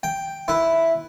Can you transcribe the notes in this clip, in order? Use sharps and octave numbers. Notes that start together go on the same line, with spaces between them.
G5
E4 B4